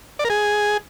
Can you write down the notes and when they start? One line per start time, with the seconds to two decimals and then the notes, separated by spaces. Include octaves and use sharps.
0.19 D5
0.25 A#4
0.30 G#4